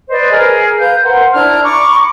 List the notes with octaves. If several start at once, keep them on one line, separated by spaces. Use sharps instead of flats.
B4 C5 D5 D#5
G#4 A#4
B4 F5 G6
A#4 C5 F#5 C6
D4 E4 A#5 F6
A#5 B5 C#6 D6